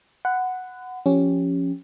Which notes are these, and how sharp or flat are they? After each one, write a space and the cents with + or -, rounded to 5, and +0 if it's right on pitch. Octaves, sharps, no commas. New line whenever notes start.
F#5 +0 B5 +40
F3 +0 C#4 +0 G4 +0